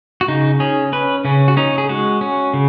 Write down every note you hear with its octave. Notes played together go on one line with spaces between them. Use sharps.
F#4
C#3 D#4
C#4 G#4
C#4 B4
C#3 C#4
F#4
C#4 D#4
G#4
G#3 F#4
C#4
C#3